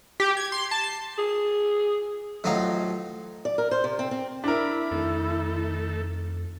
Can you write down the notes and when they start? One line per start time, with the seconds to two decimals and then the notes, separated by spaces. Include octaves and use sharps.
0.20 G4
0.37 G#6
0.52 C6
0.71 A5
0.83 C7
1.18 G#4
2.44 A1 F3 F#3 D#4 F5
3.45 D5
3.58 A#4
3.71 C5
3.84 C3
3.99 C4
4.11 C4
4.44 D4 E4 A#4 B5
4.91 F2 D#3 A3 A4